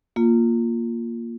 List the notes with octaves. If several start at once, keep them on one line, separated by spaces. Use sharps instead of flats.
A#3 F4